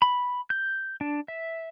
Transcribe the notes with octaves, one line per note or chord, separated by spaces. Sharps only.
B5
G6
D4
E5